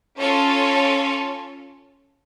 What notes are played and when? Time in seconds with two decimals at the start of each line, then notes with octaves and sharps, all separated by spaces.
0.18 C#4 F4 A4 C#5